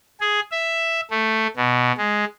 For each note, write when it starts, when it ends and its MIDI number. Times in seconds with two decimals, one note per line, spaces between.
0.21 0.40 68
0.51 1.01 76
1.11 1.47 57
1.56 1.92 47
1.97 2.25 56